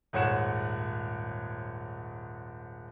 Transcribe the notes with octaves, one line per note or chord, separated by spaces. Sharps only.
D#1 G#2 C#5 F#5 E7